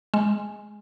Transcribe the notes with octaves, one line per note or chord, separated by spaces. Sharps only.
G#3